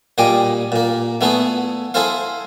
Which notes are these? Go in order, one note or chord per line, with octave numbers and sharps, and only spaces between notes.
A#2 G3 G#4 D#5 D6
A#2 A#3
A3 B3 E4 G#4 A4
E4 G#4 A4 C5 F5